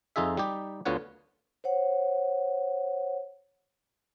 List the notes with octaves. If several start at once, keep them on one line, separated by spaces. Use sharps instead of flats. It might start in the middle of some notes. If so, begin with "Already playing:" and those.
F2 D#4 F4 G#4 E5
G3 D#4 G4
D2 D3 B3 F4 C#5 F#5
C5 C#5 F#5